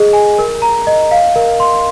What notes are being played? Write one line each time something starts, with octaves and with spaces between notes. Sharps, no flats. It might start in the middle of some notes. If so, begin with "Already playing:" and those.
Already playing: G#4 D#5
G#5
A#4
A#5
D#5
F5
A#4
C6